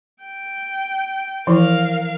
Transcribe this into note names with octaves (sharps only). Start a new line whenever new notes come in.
G5
E3 F3 E4 A#4 F5